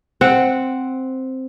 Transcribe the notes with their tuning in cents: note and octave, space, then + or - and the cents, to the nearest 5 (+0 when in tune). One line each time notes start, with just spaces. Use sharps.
C4 +0 F#5 +0